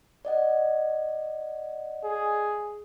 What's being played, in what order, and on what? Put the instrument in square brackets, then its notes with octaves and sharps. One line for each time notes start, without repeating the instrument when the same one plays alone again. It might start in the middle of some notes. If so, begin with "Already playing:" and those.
[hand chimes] D5 D#5 F#5
[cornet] G#4